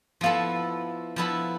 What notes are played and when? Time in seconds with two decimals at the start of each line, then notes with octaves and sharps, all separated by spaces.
0.21 F3 B3 E4 F4 A4
1.16 F3 B3 E4 A4